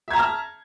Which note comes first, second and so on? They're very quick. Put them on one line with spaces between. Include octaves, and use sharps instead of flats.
E5 G#6 A#5 A5 F6